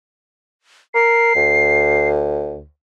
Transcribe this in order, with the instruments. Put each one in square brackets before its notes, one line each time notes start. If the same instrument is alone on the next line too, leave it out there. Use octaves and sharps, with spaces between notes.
[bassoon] A#4 [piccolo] C7
[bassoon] D2